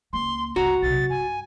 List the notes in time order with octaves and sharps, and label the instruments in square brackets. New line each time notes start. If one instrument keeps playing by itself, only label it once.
[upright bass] C#2 A#3 [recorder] C6
[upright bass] G1 C#2 [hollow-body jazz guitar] F#4 [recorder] A#5
[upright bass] B1 C3 [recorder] A6
[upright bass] G2 [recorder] G#5